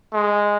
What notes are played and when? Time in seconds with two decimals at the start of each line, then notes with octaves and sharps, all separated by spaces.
0.13 G#3